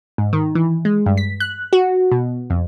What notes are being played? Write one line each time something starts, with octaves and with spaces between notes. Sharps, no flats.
G#2
D#3
E3
G#3
G2
B6
F#6
F#4
B2
F2